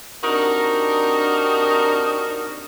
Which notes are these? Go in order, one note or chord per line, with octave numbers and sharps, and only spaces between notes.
C4 D4 D#4 F#4 G4 A#4